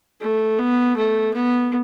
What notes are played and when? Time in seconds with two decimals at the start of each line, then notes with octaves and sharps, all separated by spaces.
0.21 A3
0.59 B3
0.96 A3
1.34 B3